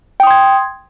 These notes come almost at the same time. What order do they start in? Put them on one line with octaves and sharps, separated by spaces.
G5 D#6 C6 G#6